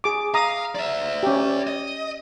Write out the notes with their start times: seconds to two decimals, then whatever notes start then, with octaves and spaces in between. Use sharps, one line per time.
0.04 G#4 D6
0.34 F5 A#5 D#6
0.75 D5 E5
1.23 C#4 G4
1.67 D#5